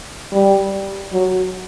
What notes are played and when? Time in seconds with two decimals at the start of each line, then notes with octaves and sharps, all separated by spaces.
0.32 G3
1.13 F#3